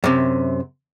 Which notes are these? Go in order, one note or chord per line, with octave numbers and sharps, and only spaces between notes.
F#2 C3